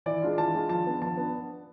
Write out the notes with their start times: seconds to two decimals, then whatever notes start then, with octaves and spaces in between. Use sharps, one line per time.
0.06 E3 D5
0.22 G#3 D4 F4
0.38 E3 A5
0.55 G#3 D4 F4
0.69 F3 A5
0.87 B3 D4
1.02 F3 A5
1.17 B3 D4